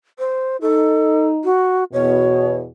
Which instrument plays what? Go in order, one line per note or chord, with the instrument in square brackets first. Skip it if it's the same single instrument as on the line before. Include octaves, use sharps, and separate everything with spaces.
[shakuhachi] C5
[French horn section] D#4 [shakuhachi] A4
[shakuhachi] F#4
[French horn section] E2 B2 [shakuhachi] C#5